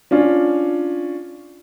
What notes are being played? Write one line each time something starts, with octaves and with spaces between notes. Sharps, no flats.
C#4 D4 F4